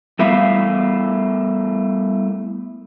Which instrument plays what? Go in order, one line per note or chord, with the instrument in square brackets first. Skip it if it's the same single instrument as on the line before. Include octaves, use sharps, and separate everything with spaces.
[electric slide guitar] G3 A3 B3 E4 E5 F5